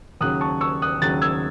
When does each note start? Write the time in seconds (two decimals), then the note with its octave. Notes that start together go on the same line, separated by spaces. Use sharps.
0.21 D#2 C#3 F#3 D#6 F#6
0.41 A5 C#6
0.61 C#6 E6
0.82 D#6 F#6
1.02 D#2 C#3 F#3 F#6 A6
1.22 E6 G#6